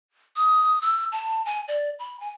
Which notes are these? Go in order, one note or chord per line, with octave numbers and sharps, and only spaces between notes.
D#6
E6
A5
G#5
D5
B5
G#5